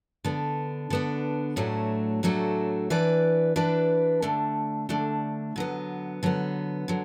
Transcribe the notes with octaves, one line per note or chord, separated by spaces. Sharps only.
D3 B3 D4
D3 B3 D4
A2 F#3 A3 D4 F#4
A2 F#3 A3 D4 F#4
E3 D4 B4 D5
E3 D4 B4 D5
D3 A3 D4
D3 A3 D4
D3 F#3 B3
D3 F#3 B3
D3 F#3